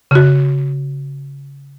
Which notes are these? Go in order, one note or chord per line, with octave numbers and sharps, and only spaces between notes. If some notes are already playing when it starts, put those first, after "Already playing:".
C#3 F#4